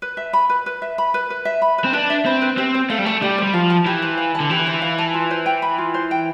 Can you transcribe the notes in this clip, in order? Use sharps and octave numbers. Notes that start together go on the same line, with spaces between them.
B4
E5
B5
B4
B4
E5
B5
B4
B4
E5
B5
B4
C4
D4 B4
E5
C4 B5
B4
C4 G4
C5
A3 F5
G3
A3 A5
G3 G4
G3 C5
F3 F5
A5
E3 G4
C5
F5
A5
D3
E3 G4
C5
F5
A5
F4
C5
G5
B5
F4
C5
G5